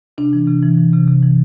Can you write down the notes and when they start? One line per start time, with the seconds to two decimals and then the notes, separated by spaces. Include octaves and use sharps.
0.18 C3 D4
0.33 E3
0.47 C3
0.63 E3
0.78 E3
0.93 C3
1.08 C3
1.23 E3